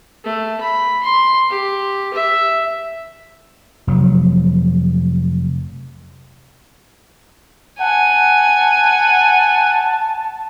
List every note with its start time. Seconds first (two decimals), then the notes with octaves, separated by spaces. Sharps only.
0.24 A3
0.61 B5
1.04 C6
1.50 G4
2.14 E5
3.87 F1 F#3
7.81 F#5 G#5 A5